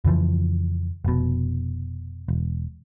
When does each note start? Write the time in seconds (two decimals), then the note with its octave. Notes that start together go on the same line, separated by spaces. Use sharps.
0.05 F2 C#3 E3 F3
1.05 F1 B2
2.28 E1